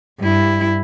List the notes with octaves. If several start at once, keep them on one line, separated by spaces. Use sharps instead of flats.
G2 E4